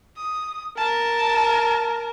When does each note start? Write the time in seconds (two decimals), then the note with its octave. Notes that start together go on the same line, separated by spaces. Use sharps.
0.16 D#6
0.78 A#4 A5